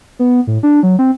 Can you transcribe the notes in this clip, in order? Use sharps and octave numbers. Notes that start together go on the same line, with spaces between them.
B3
A2
D4
F#3
C4